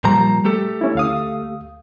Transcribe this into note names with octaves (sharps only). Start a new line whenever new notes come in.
A#2 F3 G3 A#5
A3 G4 A4
C#4 E4
D2 F5 D#6